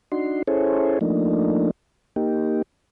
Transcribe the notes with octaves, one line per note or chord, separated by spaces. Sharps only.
D4 D#4 F#4 C6
C#4 E4 G#4 A4 C5 C#5
F3 A3 A#3 D4 D#4
A#3 D#4 G4